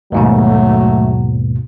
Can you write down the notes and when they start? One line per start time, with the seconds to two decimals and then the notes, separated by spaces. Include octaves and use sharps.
0.12 D#2 G#2 B2 F#3 A3